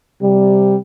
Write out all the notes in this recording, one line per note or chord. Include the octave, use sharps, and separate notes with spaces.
C3 G3